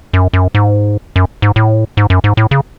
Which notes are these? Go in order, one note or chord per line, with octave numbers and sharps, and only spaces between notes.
F#2
F#2
G#2
F#2
G#2
A2
G#2
F#2
G#2
A2
C#3